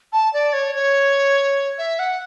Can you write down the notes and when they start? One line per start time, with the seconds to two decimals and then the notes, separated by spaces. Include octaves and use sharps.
0.13 A5
0.33 D5
0.53 C#5
0.75 C#5
1.78 E5
1.99 F#5